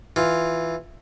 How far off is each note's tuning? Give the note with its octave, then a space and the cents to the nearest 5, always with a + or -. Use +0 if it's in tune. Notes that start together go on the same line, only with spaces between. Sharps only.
E3 +0 F4 +0